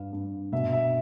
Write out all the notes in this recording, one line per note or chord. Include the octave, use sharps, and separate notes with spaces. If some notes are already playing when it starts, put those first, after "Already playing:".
Already playing: G2 F5
G2
B2 E5
E5